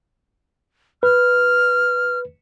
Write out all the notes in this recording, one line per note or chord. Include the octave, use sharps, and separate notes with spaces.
B4 F6